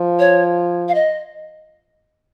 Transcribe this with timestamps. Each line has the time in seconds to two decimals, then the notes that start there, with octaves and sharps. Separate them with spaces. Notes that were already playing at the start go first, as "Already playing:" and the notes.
Already playing: F3
0.19 C#5
0.88 F5
0.95 D#5